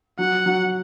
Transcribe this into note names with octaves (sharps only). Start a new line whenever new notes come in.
F#3 F#5
F#3